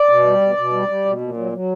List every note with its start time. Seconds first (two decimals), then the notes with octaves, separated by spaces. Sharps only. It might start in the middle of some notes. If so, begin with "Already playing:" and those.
Already playing: D5
0.09 B2
0.26 G3
0.41 B2
0.57 B2
0.73 G3
0.88 G3
1.05 B2
1.21 A#2
1.37 F#3
1.52 F#3